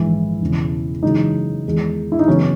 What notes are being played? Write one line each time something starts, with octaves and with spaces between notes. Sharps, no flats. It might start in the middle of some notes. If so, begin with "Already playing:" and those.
Already playing: A#1 G#2 D#3 E3 G#3 E4
E1 E2 C#3
F#2 C#3 E3 G#3 D#4
E2 D#3 G#3
E4
D#4
F#2 C#3 E3 B3 C#4